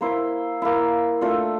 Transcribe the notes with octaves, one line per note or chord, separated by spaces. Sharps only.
A#3 E4 C5
A#3 E4
A3 D4 F4